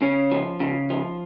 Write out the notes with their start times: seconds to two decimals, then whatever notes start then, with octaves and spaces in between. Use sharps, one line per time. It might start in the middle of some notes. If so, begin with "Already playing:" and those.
0.02 C#3 C#4
0.31 F3
0.60 C#3
0.90 F3